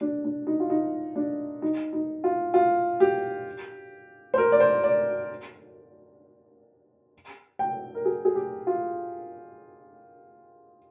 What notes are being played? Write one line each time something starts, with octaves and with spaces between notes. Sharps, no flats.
D4
D4
D#4
F4
D#4
D4
D#4
D#4
F4
F4
G4
C5
A#4
D5
C5
D5
G5
A#4
G#4
G#4
G4
F4